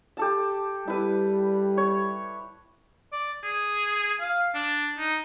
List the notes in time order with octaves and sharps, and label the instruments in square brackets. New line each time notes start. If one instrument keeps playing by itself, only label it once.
[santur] G4 A4 A5
[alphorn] G3 [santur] E4 B4
[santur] C#5
[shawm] D5
G#4
F5
D4
D#4